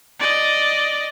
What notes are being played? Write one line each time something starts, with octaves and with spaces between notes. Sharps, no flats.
D5 D#5